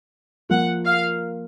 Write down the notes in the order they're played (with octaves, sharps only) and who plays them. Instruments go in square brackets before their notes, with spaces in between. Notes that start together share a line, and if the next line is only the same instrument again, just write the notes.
[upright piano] F3 A#3 F4 [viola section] F#5
[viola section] F5